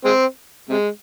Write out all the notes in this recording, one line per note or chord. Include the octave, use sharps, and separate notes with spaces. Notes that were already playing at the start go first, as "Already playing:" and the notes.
G#3 C4
C3 G#3